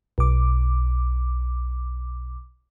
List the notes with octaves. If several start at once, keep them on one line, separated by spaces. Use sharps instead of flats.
B1 D6